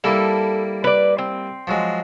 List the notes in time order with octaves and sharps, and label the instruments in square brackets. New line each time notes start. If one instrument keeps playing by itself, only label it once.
[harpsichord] G3 A#3 E4 [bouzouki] A4
[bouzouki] B4 D5
C4
[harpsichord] F3 F#3 G#3